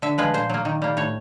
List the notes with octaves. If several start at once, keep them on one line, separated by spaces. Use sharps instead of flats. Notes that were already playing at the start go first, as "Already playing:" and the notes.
D3 E5
F3 G#3 B4
A#2 C5
F#3 A#3
D#3
G3 A#3
A2 C#5